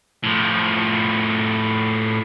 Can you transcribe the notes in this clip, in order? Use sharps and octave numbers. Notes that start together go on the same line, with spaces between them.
A2 F3